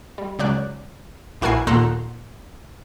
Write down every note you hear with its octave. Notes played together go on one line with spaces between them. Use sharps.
G3
C#2 F#3 D5 F#6
A#1 E4 F#4 A#4 G#5 C7
D#2 A#2 A4 F#5 A#5 C6